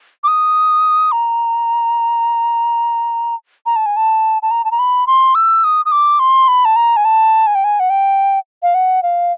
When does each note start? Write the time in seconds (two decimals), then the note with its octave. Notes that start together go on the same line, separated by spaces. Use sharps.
0.24 D6
0.28 D#6
1.12 A#5
3.66 A#5
3.76 A5
3.86 G#5
3.97 A5
4.42 A5
4.51 A#5
4.65 A5
4.71 A#5
4.79 B5
5.07 C6
5.35 E6
5.64 D#6
5.85 D#6
5.92 D6
6.19 C6
6.48 B5
6.65 A5
6.76 A#5
6.97 G#5
7.05 A5
7.47 G#5
7.55 G5
7.64 G#5
7.80 F#5
7.90 G5
8.63 F5
8.74 F#5
9.03 F5